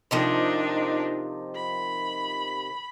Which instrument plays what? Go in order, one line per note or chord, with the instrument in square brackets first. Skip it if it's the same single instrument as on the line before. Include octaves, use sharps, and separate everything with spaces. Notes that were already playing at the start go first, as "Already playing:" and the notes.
[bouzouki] C3 D#3 F3 [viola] D4 D#4
[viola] B5